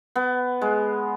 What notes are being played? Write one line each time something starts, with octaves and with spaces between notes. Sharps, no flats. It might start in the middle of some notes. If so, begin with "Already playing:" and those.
B3
G#3